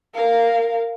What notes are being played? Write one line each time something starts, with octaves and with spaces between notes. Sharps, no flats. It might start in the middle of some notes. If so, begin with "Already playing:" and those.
A#4 F5